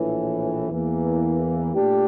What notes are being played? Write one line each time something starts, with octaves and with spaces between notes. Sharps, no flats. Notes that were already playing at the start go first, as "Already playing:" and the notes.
Already playing: A#1 A2 E3
E2 E3 A#3
A#2 A3 D4 G4